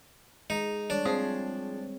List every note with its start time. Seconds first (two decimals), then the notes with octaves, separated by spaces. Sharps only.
0.50 G#3 D#4
0.90 G3 D4 C#5
1.05 F3 C4 G#4